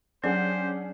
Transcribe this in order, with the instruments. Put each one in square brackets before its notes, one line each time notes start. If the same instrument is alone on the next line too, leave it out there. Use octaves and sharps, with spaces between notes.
[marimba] F#3 [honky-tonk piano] C#4 G#4 F#5 [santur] D4 [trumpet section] G4 C5